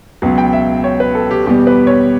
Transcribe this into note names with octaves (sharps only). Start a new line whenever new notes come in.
C#2 B2 F#3 B3
G5
E5
C#5
B4
A4
G4
E2 B2 G3 B3 G4
B4
C#5